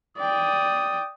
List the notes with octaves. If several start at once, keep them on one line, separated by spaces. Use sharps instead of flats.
D5 G5 D#6